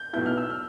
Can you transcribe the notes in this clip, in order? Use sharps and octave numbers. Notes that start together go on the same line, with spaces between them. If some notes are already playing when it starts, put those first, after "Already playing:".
Already playing: G6
B1 B2 B3 E4 G6
F6
E6
F6